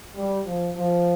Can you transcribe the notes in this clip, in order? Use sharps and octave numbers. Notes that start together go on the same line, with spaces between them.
G3
F3
F3